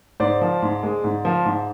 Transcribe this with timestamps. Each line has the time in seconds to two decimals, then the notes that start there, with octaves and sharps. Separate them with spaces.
0.20 G#2 C5 D5
0.41 F3
0.62 G#2
0.83 G#3
1.04 G#2
1.25 F3
1.45 G#2